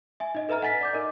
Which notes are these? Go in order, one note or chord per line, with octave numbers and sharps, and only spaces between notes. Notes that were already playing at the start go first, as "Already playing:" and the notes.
E5 G#5
D#4 D#5
A4 B4 E5 A#5 F6
F#5 G#5 A6 B6
D5 D6 G6
D#4 A#4 D#5